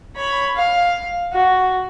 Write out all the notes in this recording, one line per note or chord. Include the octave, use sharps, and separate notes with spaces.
C#5 B5
F5
F#4